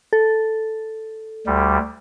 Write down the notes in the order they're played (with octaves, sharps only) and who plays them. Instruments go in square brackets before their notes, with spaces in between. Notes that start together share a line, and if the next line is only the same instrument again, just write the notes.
[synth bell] A4
[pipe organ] D2 G3